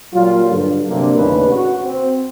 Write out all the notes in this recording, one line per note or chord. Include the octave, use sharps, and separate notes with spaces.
A#2 F#3 G3 F4
G2 D3
C3 F#3 A#3 D4
D#2 A2 C#3 D4 B4
F#4
C4